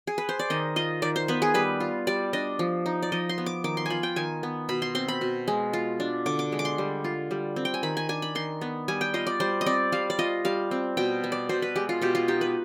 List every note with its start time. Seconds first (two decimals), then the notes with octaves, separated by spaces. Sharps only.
0.07 G#4
0.18 B4
0.29 C5
0.39 D5
0.50 D#3 D#5
0.76 F4 D#5
1.02 D#3 D5
1.16 C5
1.28 B3 B4
1.42 G#4
1.54 G3 B4
1.80 F4
2.07 G3 D5
2.33 D4 D#5
2.59 F3
2.86 D#4
3.02 D5
3.12 F3 D#5
3.29 C6
3.38 B3
3.46 D6
3.64 D#3 D6
3.77 C6
3.86 F4 G#5 B5
4.03 G5
4.16 D#3 G#5
4.43 B3
4.69 B2 B5
4.82 C6
4.95 C4 C6
5.08 B5
5.21 B2
5.48 G#3
5.73 F4
6.00 D4
6.26 D3 D6
6.39 D6
6.52 G#3
6.59 D6
6.65 C6
6.78 G3
7.04 F4
7.31 G3
7.56 C4
7.65 G5
7.74 G#5
7.83 D#3 B5
7.97 G#5
8.09 D4 G#5
8.22 B5
8.35 D#3 C6
8.61 B3
8.88 G3 G#5
9.01 G5
9.14 F4 D#5
9.27 D5
9.40 G3 C5
9.61 D#5
9.66 C4 D5
9.92 G3 F5
10.10 D5
10.19 F4 D#5
10.45 G3 F5
10.71 C4
10.97 B2 G5
11.24 B3
11.32 D5
11.49 B2 C5
11.62 B4
11.76 G#3 G4
11.89 F4
12.02 B2 G4
12.15 F4
12.28 D#4 G4
12.41 B4